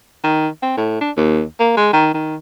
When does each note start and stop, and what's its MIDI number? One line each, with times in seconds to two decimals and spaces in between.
0.24 0.48 51
0.62 0.74 60
0.77 1.01 45
1.01 1.11 62
1.17 1.43 39
1.60 1.75 58
1.77 1.93 56
1.93 2.12 51
2.14 2.36 51